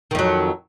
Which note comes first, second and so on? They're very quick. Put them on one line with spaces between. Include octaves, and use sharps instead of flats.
D#3 F2 F#3